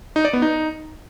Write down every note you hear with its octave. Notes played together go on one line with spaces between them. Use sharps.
D#4
D5
B3
D#4